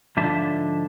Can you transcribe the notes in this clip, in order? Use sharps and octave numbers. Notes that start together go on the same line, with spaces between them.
G#2 D3 F3 D4 E5 A5